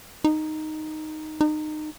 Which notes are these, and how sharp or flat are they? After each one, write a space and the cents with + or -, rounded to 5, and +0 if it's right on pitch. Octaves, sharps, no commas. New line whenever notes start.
D#4 -5
D#4 -25